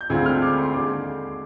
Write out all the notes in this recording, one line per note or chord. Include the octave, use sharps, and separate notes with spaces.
G6
D2 D3 G#3 C4 F4 G#6
F6
D6
C6
D#2 D3 G#3 D6